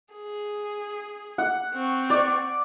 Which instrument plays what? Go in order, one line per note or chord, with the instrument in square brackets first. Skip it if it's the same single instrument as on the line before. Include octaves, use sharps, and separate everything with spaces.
[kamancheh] G#4
[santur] F#5
[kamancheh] C4 C#6
[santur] D5